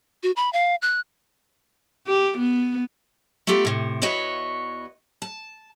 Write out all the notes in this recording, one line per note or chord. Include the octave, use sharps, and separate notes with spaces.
F#4
B5
F5
F#6
G4
B3
A3 B3 F4 G4 A4
A2 C3
E2 F#4 B4 C#5 D#5 E5
A5